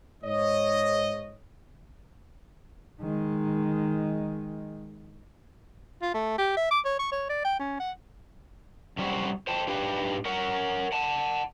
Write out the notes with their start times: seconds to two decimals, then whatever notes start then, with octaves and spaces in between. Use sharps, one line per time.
0.24 G#2 C#5 D#5
3.01 D#3 G#3
6.02 F4
6.14 A3
6.38 G4
6.57 E5
6.71 D6
6.85 C#5
6.99 C#6
7.12 C#5
7.29 D5
7.45 G5
7.59 C#4
7.80 F#5
8.97 F#2 C3 G3 C4 F#4
9.47 C5 G5 A5
9.68 G#2 D4 G4 B4 F5 G5
10.25 A#4 C#5 F#5
10.92 F#5 A5